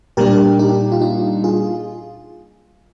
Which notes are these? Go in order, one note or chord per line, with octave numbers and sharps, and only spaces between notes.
A#2 G3 A#3 D4 G4 A#4
D#4 G4
F4
D#4
F4 G#4